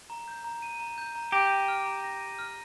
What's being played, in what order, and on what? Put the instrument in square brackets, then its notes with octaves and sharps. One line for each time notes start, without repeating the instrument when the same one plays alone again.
[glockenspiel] A#5
G6
A#5
D#7
A#5
G6
A#5
[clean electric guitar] G4 [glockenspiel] A#6
[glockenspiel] D#7
F6
A#5
A#6
D#7
F6